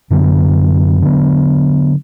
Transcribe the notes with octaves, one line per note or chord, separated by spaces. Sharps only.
F#2 D3 F#3 B3
D3 F#3 B3